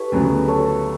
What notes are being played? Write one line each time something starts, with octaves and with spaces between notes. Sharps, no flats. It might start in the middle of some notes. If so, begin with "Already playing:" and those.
Already playing: E4 G4 A4 B4 C#5
D2 C#3 F#3 B3
A4 C#5